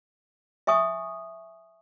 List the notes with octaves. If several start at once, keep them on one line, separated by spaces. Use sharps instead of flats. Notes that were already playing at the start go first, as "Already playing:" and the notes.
E5 G#5 C#6 D#6